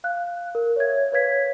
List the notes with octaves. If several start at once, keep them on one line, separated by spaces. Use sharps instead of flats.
F5 F#6
A#4
C#5 E5 G#6
B4 C#5 F5 G#6 B6